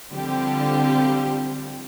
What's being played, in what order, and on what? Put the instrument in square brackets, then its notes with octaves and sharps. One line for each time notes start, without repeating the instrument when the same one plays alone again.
[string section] D3 F3 G3 C4 G4